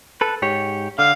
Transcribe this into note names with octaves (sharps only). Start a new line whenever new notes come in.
A4 B4
G#2 G4 C#5
D3 F5